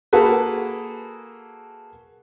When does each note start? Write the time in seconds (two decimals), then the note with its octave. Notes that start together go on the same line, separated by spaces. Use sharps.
0.13 A#3 F#4 G#4 A4 B4